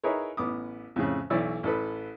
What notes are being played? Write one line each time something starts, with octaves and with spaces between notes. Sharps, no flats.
D#4 E4 G#4 A#4 B4 C#5
A1 B3 D6 D#6
F2 A2 C#3
B1 E3 C#5 D5 E6
A1 A4 B4